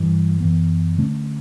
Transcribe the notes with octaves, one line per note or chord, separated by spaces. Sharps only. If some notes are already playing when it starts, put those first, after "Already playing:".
Already playing: G2 E3 G3
F#2 E3 B3
D3 A3 C#4